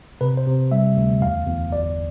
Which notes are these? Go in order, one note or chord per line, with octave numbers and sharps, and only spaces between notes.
C3 B4
C5
C3
G3 E5
D2
E2 F5
E2
G1 D5